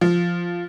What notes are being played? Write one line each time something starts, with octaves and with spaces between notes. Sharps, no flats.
F3